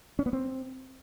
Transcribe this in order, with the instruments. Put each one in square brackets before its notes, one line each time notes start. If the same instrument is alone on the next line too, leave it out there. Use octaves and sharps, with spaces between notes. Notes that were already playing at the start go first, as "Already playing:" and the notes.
[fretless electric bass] C#4
B3
C4